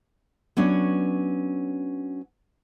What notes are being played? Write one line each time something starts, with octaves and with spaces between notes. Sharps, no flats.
F#3 B3 C#4 D4 C#5